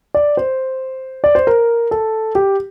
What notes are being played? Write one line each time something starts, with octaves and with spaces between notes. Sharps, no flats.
D5
C5
D5
C5
A#4
A4
G4